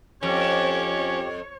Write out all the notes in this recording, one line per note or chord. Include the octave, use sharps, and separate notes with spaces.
F2 C4 C#4 G4 C#5